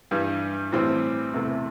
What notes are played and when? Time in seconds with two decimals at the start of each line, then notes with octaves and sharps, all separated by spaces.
0.11 G2 E3 G3
0.72 A2 E3 G3 C4
1.33 E2 C3 E3 A3 E4